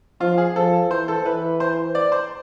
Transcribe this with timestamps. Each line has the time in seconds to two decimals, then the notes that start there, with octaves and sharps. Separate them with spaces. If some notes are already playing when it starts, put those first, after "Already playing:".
0.21 F3 F4
0.38 G#4
0.55 F3 A4
0.90 E3 C5
1.08 A4
1.25 E3 B4
1.60 C5
1.95 D5
2.12 C5